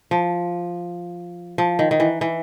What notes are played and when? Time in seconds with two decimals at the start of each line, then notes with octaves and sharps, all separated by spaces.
0.11 F3
1.58 F3
1.79 D#3
1.91 D#3
2.00 E3
2.21 E3